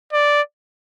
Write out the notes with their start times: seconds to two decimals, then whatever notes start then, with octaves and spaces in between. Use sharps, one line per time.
0.13 D5